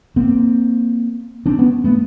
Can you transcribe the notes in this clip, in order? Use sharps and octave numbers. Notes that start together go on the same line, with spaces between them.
A#3 C4
C4 D4
B3 C#4
A3 B3